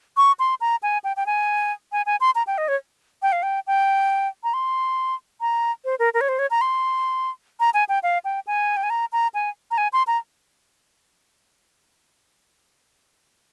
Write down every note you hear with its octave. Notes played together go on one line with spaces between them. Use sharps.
C#6
C6
A#5
G#5
G5
G5
G#5
G#5
G#5
C6
A#5
G5
D#5
C#5
G5
F5
G5
G5
A#5
C6
A#5
C5
A#4
A#4
C#5
C5
C#5
A#5
C6
A#5
G#5
G5
F5
G5
G#5
G5
G#5
A#5
A#5
G#5
A#5
G#5
C6
A#5